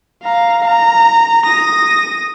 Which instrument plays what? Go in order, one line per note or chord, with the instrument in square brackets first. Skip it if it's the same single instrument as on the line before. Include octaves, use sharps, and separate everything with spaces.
[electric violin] F5 A#5
A#5
D#6 A#6